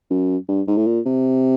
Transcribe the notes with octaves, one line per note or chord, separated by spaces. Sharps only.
F#2
G2
G#2
A2
A#2
C3